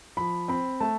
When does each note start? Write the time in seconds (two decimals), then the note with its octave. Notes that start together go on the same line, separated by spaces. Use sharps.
0.17 F3 B5
0.48 C4 B5
0.80 A3 A5